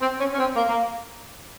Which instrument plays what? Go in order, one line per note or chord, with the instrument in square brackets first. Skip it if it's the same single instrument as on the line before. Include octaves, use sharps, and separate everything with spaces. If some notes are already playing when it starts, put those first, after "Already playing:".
[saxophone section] C4
C#4
C#4
C4
A#3
A#3